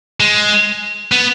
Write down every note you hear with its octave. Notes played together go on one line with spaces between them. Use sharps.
G#3
B3